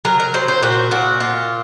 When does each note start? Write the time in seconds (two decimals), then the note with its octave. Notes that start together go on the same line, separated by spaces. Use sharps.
0.05 F#3 A#4
0.20 A#4
0.34 F#3 C5
0.48 C5
0.63 A#2 F#4
0.91 A#2 F#4
1.20 A#2 F4